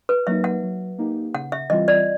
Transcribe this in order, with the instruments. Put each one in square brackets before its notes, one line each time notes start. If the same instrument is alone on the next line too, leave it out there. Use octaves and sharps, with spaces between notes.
[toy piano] B4
[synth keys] F#3 A#3 D#4 [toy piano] E5
[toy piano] F#5
[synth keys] F#3
A#3 D#4 G4
[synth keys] C#3 [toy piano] F#5
[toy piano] E5
[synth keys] E3 G3 C4 F4 [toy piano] D#5
[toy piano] D5